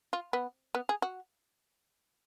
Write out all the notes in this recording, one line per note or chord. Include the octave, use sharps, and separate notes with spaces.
F4
B3
B3
G#4
F#4